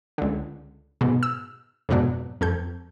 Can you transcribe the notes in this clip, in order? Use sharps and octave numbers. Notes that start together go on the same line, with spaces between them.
C#2 D3
G#2 B2
E6
F2 G#2 B2 F#3 D4
F2 A4 G6